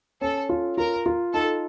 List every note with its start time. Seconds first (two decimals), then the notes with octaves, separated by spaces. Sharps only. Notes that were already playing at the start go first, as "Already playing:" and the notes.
0.21 C#4 A4
0.49 F4
0.78 F4 A#4
1.06 F4
1.33 D#4 A4